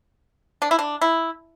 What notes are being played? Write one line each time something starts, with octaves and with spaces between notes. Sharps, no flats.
D4
E4
D4
E4